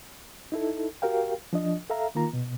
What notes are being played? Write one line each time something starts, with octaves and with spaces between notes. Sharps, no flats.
D#4 E4 A4
F#4 G4 A#4 F5 G5
F3 D4 D#5
A4 E5 F5 A#5
D#3 A#3 F4 A#5
B2